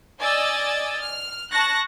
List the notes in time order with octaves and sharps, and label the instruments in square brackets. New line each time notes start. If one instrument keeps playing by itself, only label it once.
[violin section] D5 D#5 G#5 E6 A6
F6
A5 C#6 F#6 A#6